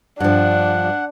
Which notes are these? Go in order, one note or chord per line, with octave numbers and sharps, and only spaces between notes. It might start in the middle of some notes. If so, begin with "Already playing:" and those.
G2 F3 D4 F#5